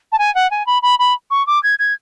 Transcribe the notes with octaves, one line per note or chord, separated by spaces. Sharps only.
A5
G#5
F#5
G#5
B5
B5
B5
C#6
D6
G#6
G#6